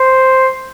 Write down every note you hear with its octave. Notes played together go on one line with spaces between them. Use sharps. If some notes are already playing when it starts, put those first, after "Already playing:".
Already playing: C5